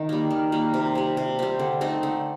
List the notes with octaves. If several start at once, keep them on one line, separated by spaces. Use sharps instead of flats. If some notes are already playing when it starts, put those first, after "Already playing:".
Already playing: D#3 D#4
G3 A#3
D#3
G3 A#3
C3
G3 C4
C3
G3 C4
D3
A3 C4 D#4
D3